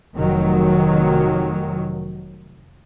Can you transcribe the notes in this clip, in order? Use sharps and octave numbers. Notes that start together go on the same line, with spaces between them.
F1 D#3 F#3